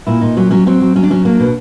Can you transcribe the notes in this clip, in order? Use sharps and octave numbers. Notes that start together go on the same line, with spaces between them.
A#2 E4
A#2 D#4
F#3 C#4
F#3 C#4
F#3 C4
F#3
F#3 C#4
D4
F#3 C#4
A#3 D4
B2